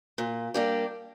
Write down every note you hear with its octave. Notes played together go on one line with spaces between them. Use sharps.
A#2
G3 A#3 D4 G4